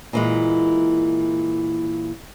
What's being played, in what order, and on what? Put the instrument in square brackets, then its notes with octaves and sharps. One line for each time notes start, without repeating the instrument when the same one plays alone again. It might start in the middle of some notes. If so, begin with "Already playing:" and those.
[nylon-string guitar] A#2 E3 G#3